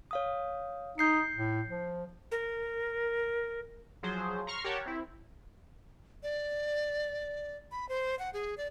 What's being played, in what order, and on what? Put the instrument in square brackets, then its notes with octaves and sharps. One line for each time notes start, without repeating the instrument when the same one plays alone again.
[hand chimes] C#5 F5 D#6
[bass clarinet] D#4 [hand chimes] G6 C7 C#7
[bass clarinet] A2
F3
[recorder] A#4
[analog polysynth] F3 F#3 G#4 C5
A#5 C6 C#6 F6
G4 A#4 C#5 F#5 A5
C4 E4
[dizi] D5
B5
C5
F#5
G#4
D5